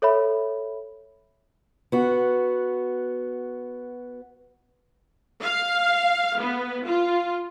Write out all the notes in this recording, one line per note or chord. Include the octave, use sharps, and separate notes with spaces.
A4 C#5 E5 B5
B3 F#4
F5
B3
F4